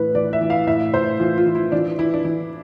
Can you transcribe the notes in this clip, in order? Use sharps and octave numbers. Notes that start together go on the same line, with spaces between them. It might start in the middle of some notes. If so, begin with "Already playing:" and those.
Already playing: A2 E3 B4
E3 D5
E5
E3
F5
A2 E5
A2 C5
E3 F4
F4
E3
E4
E3 D4
E3 E4
D4
E3 E4